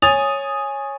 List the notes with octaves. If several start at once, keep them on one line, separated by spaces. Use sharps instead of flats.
C#5 G#5 D#6 A6 F7